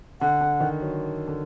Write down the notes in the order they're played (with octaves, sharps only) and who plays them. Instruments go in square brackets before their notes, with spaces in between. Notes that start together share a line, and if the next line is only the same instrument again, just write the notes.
[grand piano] D3 [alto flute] F#5
[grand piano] D3
D#3
F#3
D3